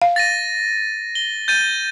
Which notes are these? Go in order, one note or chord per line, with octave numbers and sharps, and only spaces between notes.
F5
A6 A#6 D#7
G7
G6 A6 D#7